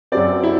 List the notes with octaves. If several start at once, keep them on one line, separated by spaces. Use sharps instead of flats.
F#2 F#3 C4 D5
E4